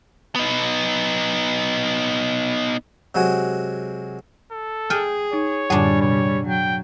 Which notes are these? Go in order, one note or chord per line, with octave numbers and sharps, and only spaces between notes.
B3 D#4
C3 F#3 G#3 F#4 G#5
A4
G#4 G5 G#5 F6
D#4 C#5
F#2 A2 D3 G3 D4 G#4
B2 C#5
F#3 G5